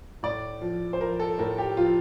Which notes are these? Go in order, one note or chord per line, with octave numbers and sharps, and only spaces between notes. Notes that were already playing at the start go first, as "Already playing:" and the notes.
A2 D5
F3
C5
F3 A#4
A4
A2 A#4
G4
F3 F4